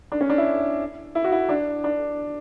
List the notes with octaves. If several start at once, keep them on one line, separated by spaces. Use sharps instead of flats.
D4
C#4
D4
E4
E4
F#4
E4
D4
D4